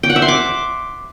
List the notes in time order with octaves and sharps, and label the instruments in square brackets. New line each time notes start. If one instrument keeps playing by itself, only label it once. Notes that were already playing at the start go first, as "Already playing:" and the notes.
[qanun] G5
F#5
E5
C6
D6